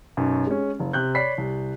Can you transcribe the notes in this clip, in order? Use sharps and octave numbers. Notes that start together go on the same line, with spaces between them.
B1 F#2
G#3 C#4
F#1
C3 F#6 G6
C#5 D5 B5 B6 C7
C2